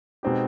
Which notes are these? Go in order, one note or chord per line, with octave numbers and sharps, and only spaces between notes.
B2 G#3 C4 D#4 G4